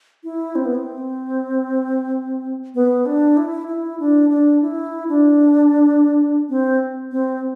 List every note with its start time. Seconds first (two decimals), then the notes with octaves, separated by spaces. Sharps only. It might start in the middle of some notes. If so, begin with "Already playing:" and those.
0.24 E4
0.55 C4
0.65 B3
0.75 C4
2.75 B3
3.06 D4
3.37 E4
3.68 E4
4.00 D4
4.30 D4
4.62 E4
5.09 D4
6.49 C4
7.11 C4